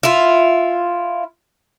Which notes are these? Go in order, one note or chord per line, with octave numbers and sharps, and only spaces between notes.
E4 F4